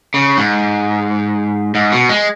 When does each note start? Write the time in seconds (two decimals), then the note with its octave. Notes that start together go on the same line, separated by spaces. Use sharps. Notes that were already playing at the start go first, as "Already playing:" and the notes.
0.14 C#3
0.37 G#2
1.75 G#2
1.92 B2
2.09 G#3